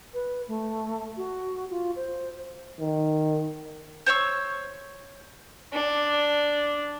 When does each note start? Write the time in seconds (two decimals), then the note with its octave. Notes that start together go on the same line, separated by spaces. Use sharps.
0.14 B4
0.48 A3
1.17 F#4
1.70 F4
1.96 C5
2.80 D#3
4.06 C5 C#5 C#6 E6
5.73 D4